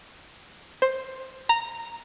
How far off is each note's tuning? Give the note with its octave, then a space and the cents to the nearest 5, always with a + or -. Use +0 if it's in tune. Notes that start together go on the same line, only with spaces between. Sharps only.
C5 +10
A#5 -10